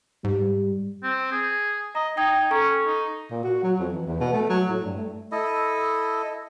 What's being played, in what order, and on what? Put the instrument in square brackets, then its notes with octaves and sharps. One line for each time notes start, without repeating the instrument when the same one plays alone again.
[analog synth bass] G#2 [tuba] G3
[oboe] C4
G#4
[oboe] D#5 [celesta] A#5
[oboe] D#4 [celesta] G5 D#6 G#6
[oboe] C#4 [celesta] A4 A#5 C#6
[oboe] D#4
[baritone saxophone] A#2
F#4
F#3
F2
E3
E2
B2
A3
F#3
A2
G2
A3
[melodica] E4 A4 D#5